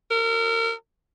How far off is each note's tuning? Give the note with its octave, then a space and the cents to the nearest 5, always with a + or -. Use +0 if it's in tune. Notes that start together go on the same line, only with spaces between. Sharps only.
A#4 -30